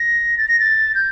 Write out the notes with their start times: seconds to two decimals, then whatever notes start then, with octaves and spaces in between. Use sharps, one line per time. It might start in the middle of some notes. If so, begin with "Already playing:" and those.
Already playing: A#6
0.38 A6
0.48 A#6
0.59 A6
0.95 G6